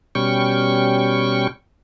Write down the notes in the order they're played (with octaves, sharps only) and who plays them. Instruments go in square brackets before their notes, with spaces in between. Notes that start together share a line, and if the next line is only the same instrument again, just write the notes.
[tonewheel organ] B2 G3 C#4 G5 C#6